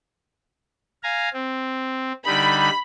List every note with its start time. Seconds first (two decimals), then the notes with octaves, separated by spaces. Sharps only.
1.03 F5 G#5 A#5
1.34 C4
2.26 D3 G3 D#4 B5